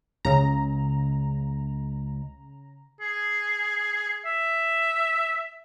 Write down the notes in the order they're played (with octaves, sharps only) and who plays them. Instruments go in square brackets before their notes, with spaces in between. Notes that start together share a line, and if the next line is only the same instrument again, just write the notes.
[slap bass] C#2 [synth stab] C#3 A#5
[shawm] G#4
E5